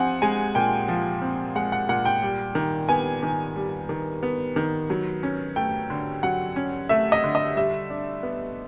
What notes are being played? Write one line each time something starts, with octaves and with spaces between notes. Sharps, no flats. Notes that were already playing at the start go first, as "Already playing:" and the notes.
Already playing: F3 C4 F#5 G#5
G#3 G#5
A#2 G5
F3
C4
G#3 F#5
F#5
A#2 F#5
G5
G3
D#3
B3 G#5
D#3
G3
D#3
B3
D#3
F#3
C#4
A3 G5
D3
F#3 F#5
C#4
A3 E5
D#5
D3
D#5
G3 E5
D4
B3